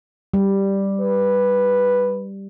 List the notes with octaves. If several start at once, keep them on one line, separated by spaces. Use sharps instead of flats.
G3
B4